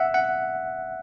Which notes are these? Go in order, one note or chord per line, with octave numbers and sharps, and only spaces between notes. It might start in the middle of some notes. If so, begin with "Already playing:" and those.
Already playing: E5 F#5
F#5